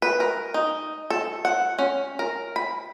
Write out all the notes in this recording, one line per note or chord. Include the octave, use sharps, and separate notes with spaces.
B4
A#4
D#4
A4
F#5
C#4
A#4
B5